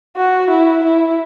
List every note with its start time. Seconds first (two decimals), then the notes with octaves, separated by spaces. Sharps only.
0.17 F#4
0.50 E4
0.84 E4